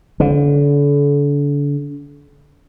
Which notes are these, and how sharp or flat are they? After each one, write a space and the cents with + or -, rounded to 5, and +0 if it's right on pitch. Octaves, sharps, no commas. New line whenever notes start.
D3 -35